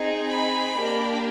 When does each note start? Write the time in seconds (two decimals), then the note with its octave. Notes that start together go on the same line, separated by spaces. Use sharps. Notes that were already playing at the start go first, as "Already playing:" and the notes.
Already playing: C4 D#4 G#4
0.28 B5
0.76 A#3 D4 G4